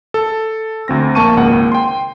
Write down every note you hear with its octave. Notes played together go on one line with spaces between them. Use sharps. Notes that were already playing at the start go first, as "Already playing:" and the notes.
A4
D2 C4 A#6
A#1 A#3 A5 C#6 D#7
G#1 C#2 A#3 F#5
G5 C6